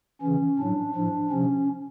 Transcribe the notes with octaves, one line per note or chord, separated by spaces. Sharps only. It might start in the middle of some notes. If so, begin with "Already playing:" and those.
C#3 E3 C#4
A2 F#3 D4
A2 F3 D4
C3 F3 C#4